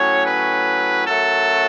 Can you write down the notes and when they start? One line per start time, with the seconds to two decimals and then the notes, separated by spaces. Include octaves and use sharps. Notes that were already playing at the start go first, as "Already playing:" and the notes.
Already playing: A2 F#3 C#4 C#5
0.25 B4
1.07 F#2 F#3 A3 A4